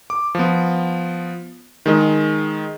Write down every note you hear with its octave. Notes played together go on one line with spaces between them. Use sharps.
D6
F3 B3
D#3 G#3 D#5